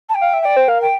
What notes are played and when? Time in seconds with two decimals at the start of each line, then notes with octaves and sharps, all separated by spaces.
0.09 A5
0.15 G5
0.21 F5
0.33 E5
0.42 D5 G5
0.57 C5
0.68 A#4 F5
0.81 G5